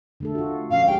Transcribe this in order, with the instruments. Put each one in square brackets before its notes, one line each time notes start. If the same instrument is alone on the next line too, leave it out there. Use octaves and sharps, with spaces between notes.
[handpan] D3 A3 A4
F4 F#4
[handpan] A#2 F3 C#4 [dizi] F5
[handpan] G#3 G4 [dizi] G5